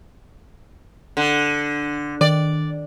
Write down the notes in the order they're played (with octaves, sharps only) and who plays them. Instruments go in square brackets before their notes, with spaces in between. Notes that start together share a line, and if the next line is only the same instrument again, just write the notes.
[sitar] D3
[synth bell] D#3 [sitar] D5